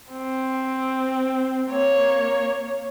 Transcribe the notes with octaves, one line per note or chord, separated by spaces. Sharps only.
C4
A#3 C#5